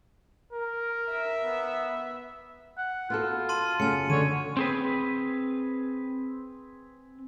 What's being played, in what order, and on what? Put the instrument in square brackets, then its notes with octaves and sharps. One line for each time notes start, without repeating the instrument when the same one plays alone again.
[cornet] A#4
[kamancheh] E5
[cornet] B3
[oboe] F#5
[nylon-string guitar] B3 F#4 A4 [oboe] F4
[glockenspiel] A5 C6 D#7
[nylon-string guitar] F#2 C#3 A3 [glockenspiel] G#5 C#7
[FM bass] D3 [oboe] C#5 [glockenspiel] D#7
[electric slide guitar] C4 G#4 B4